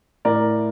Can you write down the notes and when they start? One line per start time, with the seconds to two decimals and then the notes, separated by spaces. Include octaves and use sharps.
0.25 A2 A#4 D5